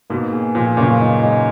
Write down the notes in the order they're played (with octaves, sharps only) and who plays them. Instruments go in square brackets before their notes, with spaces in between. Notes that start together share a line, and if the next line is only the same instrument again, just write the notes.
[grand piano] G#2 B2 [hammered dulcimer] A#3
[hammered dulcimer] G#4
[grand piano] A#2 [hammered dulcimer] F3
[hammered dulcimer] F#2 [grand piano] A#2 C#3
[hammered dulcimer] D#4
G#3